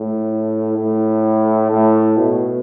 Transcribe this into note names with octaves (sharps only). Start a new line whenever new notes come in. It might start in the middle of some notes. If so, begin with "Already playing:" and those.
Already playing: A2
A2
A2
B2